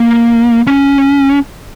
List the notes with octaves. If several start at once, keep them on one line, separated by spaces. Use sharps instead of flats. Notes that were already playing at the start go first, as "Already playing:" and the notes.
Already playing: A#3
C#4